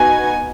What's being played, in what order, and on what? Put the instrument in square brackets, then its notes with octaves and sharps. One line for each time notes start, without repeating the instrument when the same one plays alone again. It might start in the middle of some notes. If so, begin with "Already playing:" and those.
Already playing: [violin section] B3 D#4 F#4 G#5